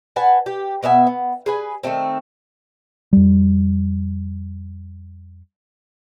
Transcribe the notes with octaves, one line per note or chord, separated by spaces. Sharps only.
B4 F#5 G#5 A5
G4
B2 B3 E5 G#5
B3
G#4 B4 G#5
D#3 G#3 A3 C4
F2 G3